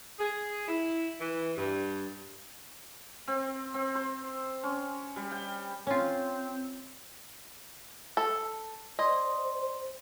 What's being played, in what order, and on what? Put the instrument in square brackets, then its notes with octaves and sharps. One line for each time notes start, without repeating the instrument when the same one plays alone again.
[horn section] G#4
E4
E3
G2
[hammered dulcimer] C4
C4
C5
C#4
G3
G5
[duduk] C4 [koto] C#4 F4
[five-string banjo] A4
[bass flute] C5 [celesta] D5 C6 [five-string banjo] D#5